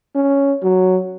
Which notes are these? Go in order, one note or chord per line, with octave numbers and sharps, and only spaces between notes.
C#4
F#3